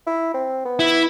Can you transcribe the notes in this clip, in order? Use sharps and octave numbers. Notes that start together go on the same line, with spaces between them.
E4
C4
B3
E4